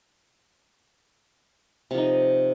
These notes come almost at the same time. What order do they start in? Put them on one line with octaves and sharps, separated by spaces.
C3 F3 D#4